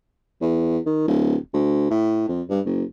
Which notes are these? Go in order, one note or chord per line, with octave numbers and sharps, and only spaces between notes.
E2
D#3
D1
D2
A2
F2
G2
F#1